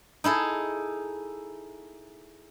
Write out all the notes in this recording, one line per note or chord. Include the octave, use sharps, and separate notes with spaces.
D#4 E4 G#4 A4